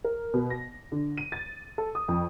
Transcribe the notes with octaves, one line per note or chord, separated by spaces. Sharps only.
A#4
B2
A#6
D3
D#7
A6
A4
D#6
F2